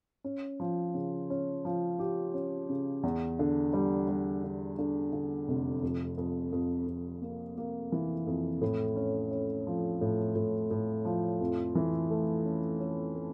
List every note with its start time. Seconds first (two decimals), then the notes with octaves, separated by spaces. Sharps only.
0.24 C#4
0.60 F3
0.94 C#3
1.30 C#4
1.65 F3
1.99 G4
2.34 C#4
2.69 C#3
3.03 E2
3.39 D3
3.73 G3
4.09 G3
4.44 D3
4.78 D3
5.13 D3
5.48 F1
5.83 F2
6.18 F2
6.52 F2
6.87 F2
7.22 A#3
7.58 A#3
7.92 E3
8.27 F2
8.62 A2
8.96 C#4
9.31 C#4
9.67 F3
10.01 A2
10.35 A2
10.71 A2
11.05 F3
11.41 F2
11.75 E3
12.10 A3
12.45 C#4
12.80 C#4
13.15 A3